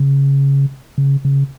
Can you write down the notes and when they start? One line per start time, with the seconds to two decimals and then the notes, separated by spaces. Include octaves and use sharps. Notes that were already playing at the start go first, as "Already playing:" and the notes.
Already playing: C#3
0.98 C#3
1.25 C#3